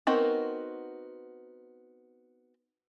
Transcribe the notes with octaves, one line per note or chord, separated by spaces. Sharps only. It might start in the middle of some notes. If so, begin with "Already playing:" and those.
B3 C4 D#4 F#4 A#4